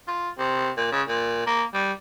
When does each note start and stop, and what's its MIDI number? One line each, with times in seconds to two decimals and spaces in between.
0.08 0.30 65
0.39 0.71 48
0.77 0.90 46
0.92 1.02 49
1.08 1.42 46
1.46 1.64 58
1.74 1.92 55